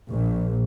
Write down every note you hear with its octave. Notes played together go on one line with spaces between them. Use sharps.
A#1